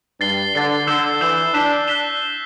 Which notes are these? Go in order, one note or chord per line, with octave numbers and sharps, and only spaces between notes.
G2 A6 C7 G7
D3 A6 C7 G7
D3 E6 G6 C7 E7 G7
E3 E6 G6 C7 E7 G7
D4 F#6 B6 E7 G7
F#6 B6 E7 G7